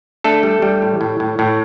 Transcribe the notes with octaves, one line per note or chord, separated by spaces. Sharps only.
A3 D4 A4
G3
G3
A2
A2
A2
A2